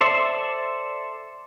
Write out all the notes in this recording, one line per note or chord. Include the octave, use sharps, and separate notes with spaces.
A4 C5 D5 E5